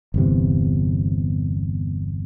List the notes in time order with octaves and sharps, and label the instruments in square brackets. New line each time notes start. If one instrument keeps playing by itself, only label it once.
[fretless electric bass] G1 E2 C3